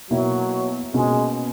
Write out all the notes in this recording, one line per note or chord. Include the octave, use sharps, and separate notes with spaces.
B2 F#3 A#3 E4
B2 G#3 A#3 C#4 F#4